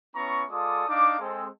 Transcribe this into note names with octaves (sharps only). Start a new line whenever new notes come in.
B3 C#4 E4 A#5 C#6
G#3 F4 A4 D5 D6 D#6
D4 D#4 F5 D6
G#3 C4 A4